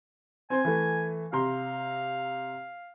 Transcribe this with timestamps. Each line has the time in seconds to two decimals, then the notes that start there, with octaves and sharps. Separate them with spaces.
0.50 C4 C5 G#5
0.65 E3 A3
1.33 C3 F5 A#5 C6